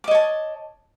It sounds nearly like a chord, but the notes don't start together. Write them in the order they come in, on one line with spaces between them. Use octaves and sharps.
D6 D#5 C#5 A5